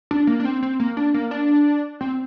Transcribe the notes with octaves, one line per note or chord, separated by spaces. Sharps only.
D4
A#3
D4
C4
C4
A#3
D4
A#3
D4
C4